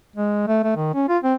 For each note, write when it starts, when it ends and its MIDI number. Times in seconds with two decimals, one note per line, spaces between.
0.16 0.43 56
0.47 0.61 57
0.63 0.75 57
0.76 0.91 51
0.94 1.07 61
1.08 1.18 65
1.24 1.34 60